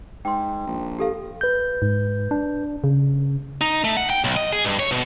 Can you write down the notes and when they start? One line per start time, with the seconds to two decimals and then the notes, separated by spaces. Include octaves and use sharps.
0.25 G#2 G5 C6
0.67 A#1
0.99 G4 A4 F5
1.41 B4 G6
1.82 G#2
2.31 D4
2.84 C#3
3.61 D#4
3.85 A3
3.97 F#5
4.10 G5
4.24 B1
4.37 D#5
4.52 G#4
4.64 G2
4.79 C#5
4.91 B2